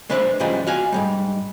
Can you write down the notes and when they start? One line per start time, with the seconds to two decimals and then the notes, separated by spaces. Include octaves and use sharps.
0.10 G#3 D4 B4 C5 E5
0.40 G#2 C#3 E3 F3 G3 G#3
0.67 F#4 F5 G#5
0.92 G#2 F3 G3